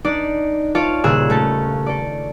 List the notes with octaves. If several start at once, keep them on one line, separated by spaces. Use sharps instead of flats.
D4 D#4 D5
F4 C#5 D5 F5 A5
D#1 A#2 C#3 G#4 E6 F#6
A3 C#4 A5
A4 D5